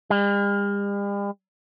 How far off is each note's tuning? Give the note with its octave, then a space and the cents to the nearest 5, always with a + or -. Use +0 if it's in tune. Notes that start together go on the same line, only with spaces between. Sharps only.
G3 +45